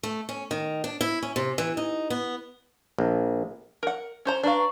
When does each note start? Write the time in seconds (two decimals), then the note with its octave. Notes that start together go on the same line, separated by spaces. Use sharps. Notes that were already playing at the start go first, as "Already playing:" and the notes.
0.03 A3
0.29 C#4
0.51 D#3
0.84 D4
1.01 E4
1.23 C#4
1.36 C3
1.58 E3
1.77 D#4
2.10 B3
2.99 A#1
3.83 A#4 F#5
4.25 C#4 C5 A#5
4.43 D4 F#4 B4 F5 A#5 C#6